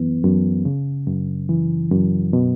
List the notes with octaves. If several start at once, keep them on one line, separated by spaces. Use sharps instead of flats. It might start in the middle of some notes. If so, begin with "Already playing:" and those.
Already playing: F#2 E3 B3
F#2
C#3
F#2
E3
F#2
B2